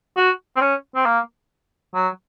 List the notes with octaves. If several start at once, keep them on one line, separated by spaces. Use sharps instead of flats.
F#4
C4
C#4
C4
A#3
F#3